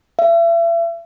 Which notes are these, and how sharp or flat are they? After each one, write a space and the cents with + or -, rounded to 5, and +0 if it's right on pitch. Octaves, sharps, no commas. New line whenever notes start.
E5 +35